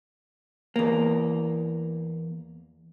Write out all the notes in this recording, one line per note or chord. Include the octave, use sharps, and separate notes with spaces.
E2 A#3